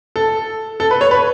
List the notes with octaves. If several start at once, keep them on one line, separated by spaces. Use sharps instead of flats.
A4
A4
B4
C#5
B4